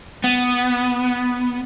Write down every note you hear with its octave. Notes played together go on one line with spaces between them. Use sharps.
B3